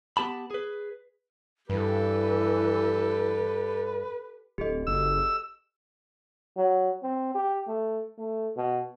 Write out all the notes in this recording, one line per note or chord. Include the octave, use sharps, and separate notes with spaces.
B3 G4 A5 B5
G#4 B4
G2 E3 G4 A4 B4
D1 G4 A4 D#5
F#1 E6
F#3
C4
G4
A3
A3
B2